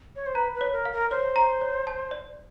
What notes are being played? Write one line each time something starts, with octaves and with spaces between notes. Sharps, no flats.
C#5
C5
B4 A#5
B4
C#5
A#4
F5
A#4
C5 C#5
A#5
C#5
A5
D5